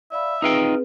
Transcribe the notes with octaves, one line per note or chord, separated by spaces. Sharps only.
D5 E5 F5 B5
C4 D#4 F4 G#4 B4 G5